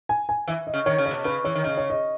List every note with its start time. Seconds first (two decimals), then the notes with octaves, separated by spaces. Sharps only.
0.09 G#5
0.29 G#5
0.48 E3 E5
0.67 D#5
0.74 C#3
0.86 D#3 C#5
0.98 C#3
1.06 C#5
1.11 B2
1.24 C#3 B4
1.45 E3 C#5
1.56 D#3
1.64 C#3 D#5
1.77 C#5
1.90 D#5